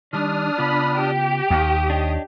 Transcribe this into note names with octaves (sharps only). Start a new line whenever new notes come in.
D#3 G3 D4 D#6 F6
C#3 B3 F4 B5
G4
D#2 D#6
D4 C#5 D#5